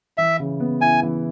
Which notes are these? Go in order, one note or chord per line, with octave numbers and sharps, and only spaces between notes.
E3 E5
C#3
B3
E4 G#5
E3